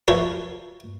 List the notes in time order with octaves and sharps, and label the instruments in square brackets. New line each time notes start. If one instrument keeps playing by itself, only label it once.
[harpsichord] E3 F3 A#4 C#5